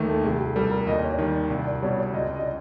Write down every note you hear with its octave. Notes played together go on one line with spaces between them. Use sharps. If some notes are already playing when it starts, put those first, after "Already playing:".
Already playing: D#2 D#3 A3
A4
C2 G#4
G4
B2 G3 B3 A4
A#4
D#2 D#5
D5
C#5
D5
D#3 G3
C2 D5
D5
B2 G3 C#5
D5
C#2 D#5
D5
D#5
D5